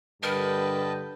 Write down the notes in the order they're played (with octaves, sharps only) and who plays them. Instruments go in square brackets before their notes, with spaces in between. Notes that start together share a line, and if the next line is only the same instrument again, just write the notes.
[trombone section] G2 D3 G3 [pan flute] A#4 [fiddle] B4 [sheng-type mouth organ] D#5 G5 A5